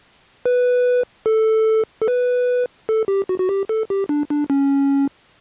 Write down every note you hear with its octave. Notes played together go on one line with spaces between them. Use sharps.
B4
A4
A4
B4
A4
G4
F#4
F#4
G4
A4
G4
D4
D4
C#4